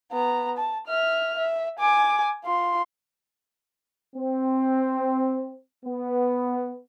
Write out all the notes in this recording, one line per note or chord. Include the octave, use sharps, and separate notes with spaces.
B3 A#5
A5
E5 F6
E5
G#5 D6
F4 C6
C4
B3